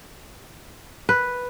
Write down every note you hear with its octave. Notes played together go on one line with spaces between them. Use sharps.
B4